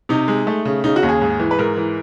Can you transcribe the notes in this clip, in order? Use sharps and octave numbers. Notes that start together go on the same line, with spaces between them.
C3 D#4
G#3
A3
C#3
C#3 D#4
F#4
D#2
G#4
G#2
E3
B4
G#2 A#4
E3